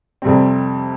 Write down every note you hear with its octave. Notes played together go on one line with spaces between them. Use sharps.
F2 C3 G3 C4